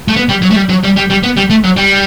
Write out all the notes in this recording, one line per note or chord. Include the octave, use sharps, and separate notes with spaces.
A3
B3
G3
F#3
A3
G3
F#3
G3
G3
G3
B3
G3
A3
F#3
G3